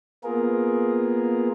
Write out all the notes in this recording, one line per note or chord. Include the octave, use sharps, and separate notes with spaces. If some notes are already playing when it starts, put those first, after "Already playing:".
A#3 B3 F4 G#4 A#4